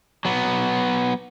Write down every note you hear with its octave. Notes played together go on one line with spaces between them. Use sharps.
F#3 B3